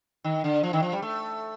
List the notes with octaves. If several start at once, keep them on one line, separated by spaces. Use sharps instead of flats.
D#3
D3
F3
D#3
F3
G3
A3